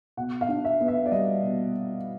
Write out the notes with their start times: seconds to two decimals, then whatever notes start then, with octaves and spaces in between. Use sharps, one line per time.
0.17 B2 F#5
0.41 F5
0.49 D4
0.64 E5
0.81 B3
0.88 E5
1.06 D5
1.11 G3 D#5
1.43 B2